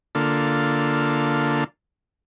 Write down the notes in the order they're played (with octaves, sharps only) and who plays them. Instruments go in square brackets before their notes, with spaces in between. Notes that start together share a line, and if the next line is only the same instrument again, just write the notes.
[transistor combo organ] D3 A#3 F4 A4